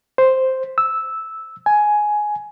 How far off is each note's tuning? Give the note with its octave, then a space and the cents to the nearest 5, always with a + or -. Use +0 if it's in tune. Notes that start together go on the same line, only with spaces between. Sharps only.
C5 +0
E6 -10
G#5 +10